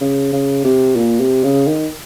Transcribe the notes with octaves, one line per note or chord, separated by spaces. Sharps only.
C#3
C#3
C3
A#2
C3
C#3
D#3